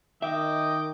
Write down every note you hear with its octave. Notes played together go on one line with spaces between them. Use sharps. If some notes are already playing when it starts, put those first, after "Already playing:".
D#3 D#5 E5 G5 D6 G6